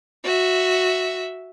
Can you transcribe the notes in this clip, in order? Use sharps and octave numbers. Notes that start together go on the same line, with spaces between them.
F#4 E5